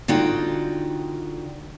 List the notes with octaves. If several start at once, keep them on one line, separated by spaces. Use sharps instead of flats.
D3 D#4 F4 F#4 G5